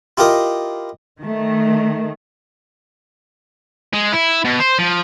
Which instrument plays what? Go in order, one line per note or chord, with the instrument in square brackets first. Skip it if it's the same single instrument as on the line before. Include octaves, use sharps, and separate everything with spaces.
[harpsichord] E4 F4 G4 A#4 D#5
[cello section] D#3 A3
[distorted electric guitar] G#3
E4
B2
C5
F3